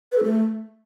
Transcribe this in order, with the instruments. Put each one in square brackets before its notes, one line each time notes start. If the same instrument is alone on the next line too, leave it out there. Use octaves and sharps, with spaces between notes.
[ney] B4
A4
A3